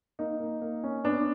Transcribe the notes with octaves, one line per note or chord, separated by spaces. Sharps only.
A#3 D#4
A#3
A#3
C#4
B3 D4